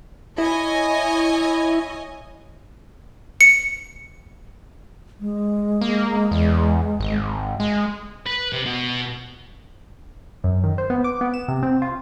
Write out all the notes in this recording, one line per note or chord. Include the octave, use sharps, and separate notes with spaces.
E4 C#5 D#5 G#5
C#7
G#3
A#3
E2
G#1
G#3
B4
C3
B2
F#2
D#3
C5
B3
D6
B3
E7
C3
C4
F4